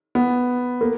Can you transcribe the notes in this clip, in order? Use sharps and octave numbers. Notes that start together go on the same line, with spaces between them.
B3
A#3